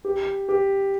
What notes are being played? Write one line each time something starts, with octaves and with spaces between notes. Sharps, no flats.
G4
G4